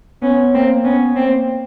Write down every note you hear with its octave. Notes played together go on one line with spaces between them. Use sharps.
B3 C#4
A#3 C4
B3 C#4
A#3 C4